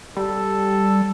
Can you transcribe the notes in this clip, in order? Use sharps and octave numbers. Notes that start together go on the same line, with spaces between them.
G3 A4